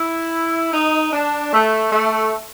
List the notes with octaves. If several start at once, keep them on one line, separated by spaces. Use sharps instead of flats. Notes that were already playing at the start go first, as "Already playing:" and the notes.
Already playing: E4
D#4
D4
A3
A3